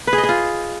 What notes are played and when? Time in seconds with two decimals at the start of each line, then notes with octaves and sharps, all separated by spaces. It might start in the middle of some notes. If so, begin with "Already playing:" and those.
0.07 B4
0.13 G#4
0.18 D#5
0.23 G#4
0.29 F4